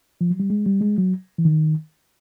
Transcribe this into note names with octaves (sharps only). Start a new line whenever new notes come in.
F3
F#3
G3
G#3
G3
G#3
F#3
E3
D#3